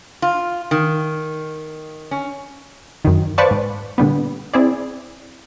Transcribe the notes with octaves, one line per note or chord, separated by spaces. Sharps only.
F4
D#3
C#4
F#2 D#3
B4 C5 D5 F5 A5 C#6
G#2
A#2 D3 G3 B3
C4 E4 G#4 D5